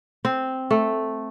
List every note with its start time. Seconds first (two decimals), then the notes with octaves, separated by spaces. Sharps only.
0.25 C4
0.71 A3